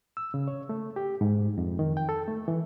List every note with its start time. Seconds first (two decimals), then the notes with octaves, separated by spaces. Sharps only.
0.17 E6
0.34 C#3
0.48 C#5
0.69 A3
0.96 G4
1.21 G#2
1.58 F2
1.79 D#3
1.97 G5
2.09 A4
2.28 A3
2.48 E3